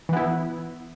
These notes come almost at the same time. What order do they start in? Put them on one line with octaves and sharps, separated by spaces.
E3 B3 E4